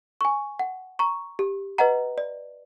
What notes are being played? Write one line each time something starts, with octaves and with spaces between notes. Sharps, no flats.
G#5 C#6
F#5
A#5 C#6
G4
B4 D#5 F#5 A#5
D5